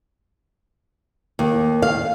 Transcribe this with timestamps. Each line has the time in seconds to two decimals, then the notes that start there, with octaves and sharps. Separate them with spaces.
1.39 D#2
1.82 F5